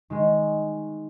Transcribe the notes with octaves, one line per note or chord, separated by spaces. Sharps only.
D#3 G#3